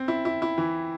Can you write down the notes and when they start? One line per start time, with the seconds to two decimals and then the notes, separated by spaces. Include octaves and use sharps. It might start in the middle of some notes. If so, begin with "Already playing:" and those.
Already playing: C4
0.08 E4
0.25 E4
0.42 E4
0.58 E3